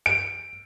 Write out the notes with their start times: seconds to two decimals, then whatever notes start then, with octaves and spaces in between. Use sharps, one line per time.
0.06 D7